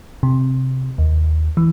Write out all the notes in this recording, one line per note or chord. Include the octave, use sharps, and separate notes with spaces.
C3
D#2
E3